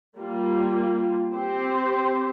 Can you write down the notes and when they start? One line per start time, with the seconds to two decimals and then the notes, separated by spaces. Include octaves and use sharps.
0.17 G3 A#3 F4
1.32 C4 G4 C5